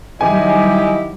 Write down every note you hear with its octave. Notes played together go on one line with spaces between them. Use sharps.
D#3 F#3 G3 E4 G4 D#5 G#5